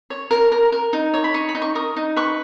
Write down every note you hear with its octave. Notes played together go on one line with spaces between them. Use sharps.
C#5
A#4
A#4
A#4
D#4
C#5
B5
D#4 C#6
B5
D#4
C#6
A#4 D#6
D#4
B4 C#6